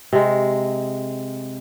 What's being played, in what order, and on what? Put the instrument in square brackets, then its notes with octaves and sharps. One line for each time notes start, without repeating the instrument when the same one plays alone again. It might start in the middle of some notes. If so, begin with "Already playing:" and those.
[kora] C3 G#3